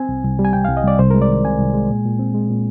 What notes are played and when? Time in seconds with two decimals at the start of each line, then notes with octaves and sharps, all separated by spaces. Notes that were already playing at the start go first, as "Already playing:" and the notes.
Already playing: C4 G#5
0.09 C2
0.24 C2
0.39 G3
0.45 G#5
0.53 C3 G5
0.65 C2 F5
0.77 D#5
0.84 C2 D5
0.99 C2 C5
1.11 G#3 A#4
1.22 D5
1.29 D#3
1.45 C3 G#5
1.59 C2
1.74 G#3
1.90 A#2
2.05 A#2
2.19 C4
2.34 G#3
2.50 A#2